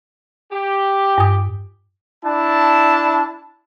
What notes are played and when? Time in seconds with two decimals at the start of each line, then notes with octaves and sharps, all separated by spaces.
0.52 G4
1.18 G2 D#6
2.25 D4 E4 A5